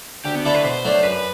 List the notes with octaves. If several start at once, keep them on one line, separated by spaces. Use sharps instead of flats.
D2 G4
B3
D3 A3 E4 A4
B4
B2 C5
F#3 A3 D4
F#2 B4